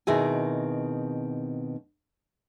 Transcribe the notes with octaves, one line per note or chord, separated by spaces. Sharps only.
B2 D#3 C4 E4 G#4 G#5